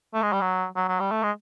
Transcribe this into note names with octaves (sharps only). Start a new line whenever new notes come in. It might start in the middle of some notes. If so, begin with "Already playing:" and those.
A3
G#3
G3
F#3
F#3
F#3
G3
A3
G#3